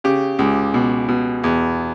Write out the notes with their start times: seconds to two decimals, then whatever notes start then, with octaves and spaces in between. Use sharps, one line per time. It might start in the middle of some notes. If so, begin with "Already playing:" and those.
0.04 C#3 G4
0.39 C#2
0.74 B2
1.08 B2
1.44 E2